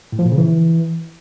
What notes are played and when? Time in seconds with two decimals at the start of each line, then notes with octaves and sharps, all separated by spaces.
0.12 A2
0.19 F3
0.25 A#2
0.32 C#3
0.38 E3